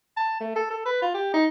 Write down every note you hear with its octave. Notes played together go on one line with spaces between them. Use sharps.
A5
A3
A4
A4
B4
F4
G4
D#4